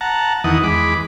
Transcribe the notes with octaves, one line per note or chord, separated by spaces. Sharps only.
F#5 A5 A#5
E2 D#3 E3 F#5 D#6
E2 G#3 B5 D6